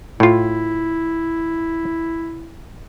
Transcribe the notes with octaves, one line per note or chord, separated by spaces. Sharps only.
A2 E4 F4